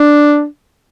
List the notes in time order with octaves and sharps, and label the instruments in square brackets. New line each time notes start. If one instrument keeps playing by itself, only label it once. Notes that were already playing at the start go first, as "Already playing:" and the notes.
Already playing: [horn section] D4